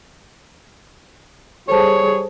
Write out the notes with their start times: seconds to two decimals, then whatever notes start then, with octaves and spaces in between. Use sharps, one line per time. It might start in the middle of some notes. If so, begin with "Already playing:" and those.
1.68 G3 G#4 A4 C5 C#5 A5